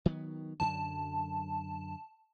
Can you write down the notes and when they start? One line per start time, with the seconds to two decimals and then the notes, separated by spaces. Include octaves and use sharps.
0.06 D#3 F#3 B3
0.60 F#2 D3 F#3 A5